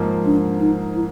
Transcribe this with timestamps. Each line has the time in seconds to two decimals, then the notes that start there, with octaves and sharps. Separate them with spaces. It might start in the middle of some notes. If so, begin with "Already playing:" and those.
Already playing: G#2 F3 A#3
0.25 D4
0.60 D#4
0.95 E4